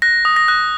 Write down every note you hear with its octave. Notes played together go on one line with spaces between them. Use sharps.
F#6 A#6
D#6
A#6
F#6